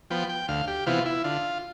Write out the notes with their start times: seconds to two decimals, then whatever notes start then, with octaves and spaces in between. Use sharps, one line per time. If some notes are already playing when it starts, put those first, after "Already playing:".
0.10 F3 B3 G5
0.29 G5
0.48 D2 F5
0.68 G4
0.86 C3 E3 B3 F4
1.05 E4
1.24 D3 F4